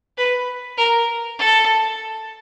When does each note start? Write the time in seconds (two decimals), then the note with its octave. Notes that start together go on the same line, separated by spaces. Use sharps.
0.18 B4
0.78 A#4
1.39 A4